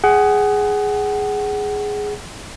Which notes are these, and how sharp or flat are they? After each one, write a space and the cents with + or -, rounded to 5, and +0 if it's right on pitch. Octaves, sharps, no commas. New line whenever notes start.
G#4 +0 F#5 +25